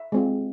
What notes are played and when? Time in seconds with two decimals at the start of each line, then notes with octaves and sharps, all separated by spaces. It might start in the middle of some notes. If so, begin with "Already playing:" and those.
Already playing: E5
0.12 G#3 C4 F4